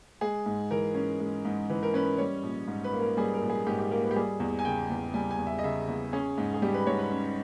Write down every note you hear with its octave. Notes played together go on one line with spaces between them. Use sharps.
G#3 G#4
G#2
E3 A#4
C#4
G#3
G#2
E3 B4
A#4
C#4 B4
G3 C#5
A#1
G#2
B4
A#3
A#4
G3 G#4
A#4
A#1
G#4
G#2 G4
G4
A#3 A#4
B4
G4
G3 G#4
E2
G#5
C#3 G5
E2
G3 G#5
G#5
E2
E5
D#5
C#3 E5
E2
C#4 G#4
G#2
G#4
G3 G4
B4
G#2 C#5
B4
C#4